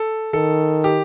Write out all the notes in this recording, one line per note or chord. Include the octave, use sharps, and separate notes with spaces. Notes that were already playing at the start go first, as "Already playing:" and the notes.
Already playing: A4
D#3 A4
G4